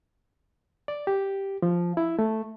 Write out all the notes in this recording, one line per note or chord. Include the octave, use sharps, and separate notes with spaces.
D5
G4
F3
E4
A3